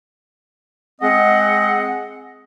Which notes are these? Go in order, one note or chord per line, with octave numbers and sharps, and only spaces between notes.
G#3 C4 D#5 F#5